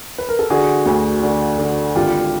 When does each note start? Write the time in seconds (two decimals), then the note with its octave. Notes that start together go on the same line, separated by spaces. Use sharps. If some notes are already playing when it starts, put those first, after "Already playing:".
0.18 B4
0.29 A#4
0.39 A4
0.50 D3 F#4 G#4
0.86 D2
1.23 D3
1.59 D3
1.96 G#1 F4 G4